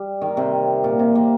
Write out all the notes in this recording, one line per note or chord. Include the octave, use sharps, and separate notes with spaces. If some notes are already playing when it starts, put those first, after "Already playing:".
Already playing: G3
D#3
C3
A#2
C3
A#3